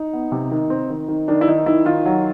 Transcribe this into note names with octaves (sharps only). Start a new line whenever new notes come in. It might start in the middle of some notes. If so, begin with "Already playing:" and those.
Already playing: D#4
B3
C3
D#3
C4
D#3
D#3
D#3 D4
E4
D#3 D#4
D#3 E4
D#3 F4
F#3